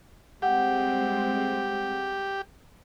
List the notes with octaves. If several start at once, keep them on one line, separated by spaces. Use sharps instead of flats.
G3 G#3 C4 G4 F#5